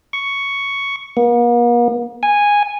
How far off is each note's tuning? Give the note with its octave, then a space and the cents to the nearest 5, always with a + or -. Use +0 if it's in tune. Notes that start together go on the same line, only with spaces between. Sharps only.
C#6 +5
A#3 +45
G#5 -10